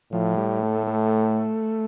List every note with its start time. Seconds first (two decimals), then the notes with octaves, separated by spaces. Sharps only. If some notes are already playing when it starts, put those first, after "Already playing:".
0.12 A2 F3
0.37 G3
0.63 A3
0.87 A3